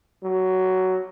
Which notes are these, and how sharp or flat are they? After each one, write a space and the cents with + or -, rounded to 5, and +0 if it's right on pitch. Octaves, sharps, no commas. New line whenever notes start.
F#3 +10